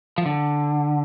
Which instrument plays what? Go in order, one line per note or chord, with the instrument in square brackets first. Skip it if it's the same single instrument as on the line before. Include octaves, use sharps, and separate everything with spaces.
[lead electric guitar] F3
D3